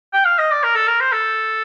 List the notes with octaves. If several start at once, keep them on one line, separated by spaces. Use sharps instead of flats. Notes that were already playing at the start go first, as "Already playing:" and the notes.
G5
F5
D#5
D5
A#4
A4
A#4
C5
A4